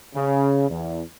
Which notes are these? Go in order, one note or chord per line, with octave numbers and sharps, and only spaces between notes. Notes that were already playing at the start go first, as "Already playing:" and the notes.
C#3
E2